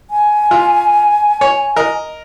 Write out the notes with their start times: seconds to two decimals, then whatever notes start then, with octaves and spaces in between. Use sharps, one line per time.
0.10 G#5
0.51 F4
1.41 C#5
1.76 A#4 D#5